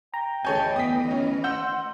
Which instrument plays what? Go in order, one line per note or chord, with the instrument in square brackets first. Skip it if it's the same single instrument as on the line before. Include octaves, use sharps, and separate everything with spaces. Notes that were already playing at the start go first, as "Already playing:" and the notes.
[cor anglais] G5 [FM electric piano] A#5
[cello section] D2 E3 D#5 [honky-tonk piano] G#4 C#5 G#5 [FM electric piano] A5 G6
[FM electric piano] B3 [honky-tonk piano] D#6 B6
[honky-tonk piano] C#4
[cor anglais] C5 [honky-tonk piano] F#5 E6 [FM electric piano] G6